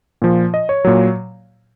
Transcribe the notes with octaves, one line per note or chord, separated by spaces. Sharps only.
A#2 F3
D#5
C#5
A#2 F#3